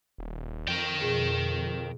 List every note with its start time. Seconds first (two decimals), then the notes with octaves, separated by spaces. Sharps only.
0.18 D#1
0.68 F2 A#4 G5
1.02 B2 G#4